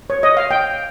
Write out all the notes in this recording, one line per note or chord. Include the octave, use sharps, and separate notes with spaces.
C#5
D#5
F5
G5